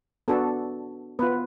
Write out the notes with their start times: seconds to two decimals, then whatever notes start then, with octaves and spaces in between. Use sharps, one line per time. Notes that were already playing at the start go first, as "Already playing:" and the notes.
0.28 B3 D4 F#4 A4
1.19 B3 F4 B4